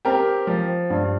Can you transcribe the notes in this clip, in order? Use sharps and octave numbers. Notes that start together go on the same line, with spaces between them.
C4 G4 A#4
F3
G2